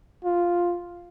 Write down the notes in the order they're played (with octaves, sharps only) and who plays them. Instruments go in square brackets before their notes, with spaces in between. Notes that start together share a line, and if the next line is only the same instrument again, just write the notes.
[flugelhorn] F4